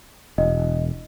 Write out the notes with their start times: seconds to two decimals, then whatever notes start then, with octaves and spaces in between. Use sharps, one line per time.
0.38 E1 D#5